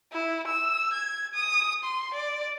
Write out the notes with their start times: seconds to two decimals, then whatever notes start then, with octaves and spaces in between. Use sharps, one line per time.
0.13 E4
0.47 E6
0.93 G#6
1.34 D#6
1.84 C6
2.14 D5